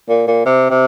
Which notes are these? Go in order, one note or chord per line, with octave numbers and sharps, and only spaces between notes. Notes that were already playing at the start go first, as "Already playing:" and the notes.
A#2
A#2
C3
C3